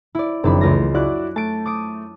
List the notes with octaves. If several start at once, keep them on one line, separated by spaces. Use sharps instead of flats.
E4 D5
F#1 D#3 F3 C4 D4 B5
C#2 E3 A3 F4 A#6
E4 F#4 D5 D6 F#6
A3 A5 D7
D6 D#6 D7